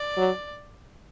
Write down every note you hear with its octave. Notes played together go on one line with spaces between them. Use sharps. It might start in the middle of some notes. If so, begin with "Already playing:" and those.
Already playing: D5
F#3